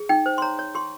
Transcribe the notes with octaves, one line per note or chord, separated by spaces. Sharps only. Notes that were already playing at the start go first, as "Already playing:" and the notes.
Already playing: G#4
D#4 G5
C5
C6
C#5 A#5
C#5
G4 C6